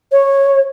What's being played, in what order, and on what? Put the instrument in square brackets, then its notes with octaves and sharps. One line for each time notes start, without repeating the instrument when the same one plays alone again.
[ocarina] C#5